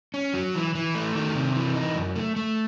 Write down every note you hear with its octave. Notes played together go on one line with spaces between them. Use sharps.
C#4
F#3
E3
E3
A3
D#3
C3
E3
D#4
F#2
A3
A3